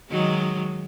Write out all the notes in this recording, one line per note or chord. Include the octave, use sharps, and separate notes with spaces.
D#3 F#3 G#3